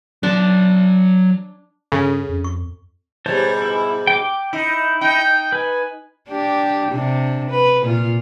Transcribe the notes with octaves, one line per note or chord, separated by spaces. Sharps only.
F#3 D4 C6
G2 C#3 A4 G#5
F2
C#6
G#2 B2 G3 C5 C#5 A5
E4
G5 D6
D#4 E4
D#4 G5
B4 G#5
D4 G4
C3 D4
B4
A#2 F4